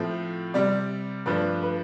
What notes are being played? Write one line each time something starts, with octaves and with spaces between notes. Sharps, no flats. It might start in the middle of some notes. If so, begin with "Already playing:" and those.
Already playing: A2 F3 C4
C3 G3 C4 D5
G2 F3 A3 D4 B4
B4